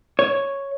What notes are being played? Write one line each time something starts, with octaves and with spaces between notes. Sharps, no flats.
C#5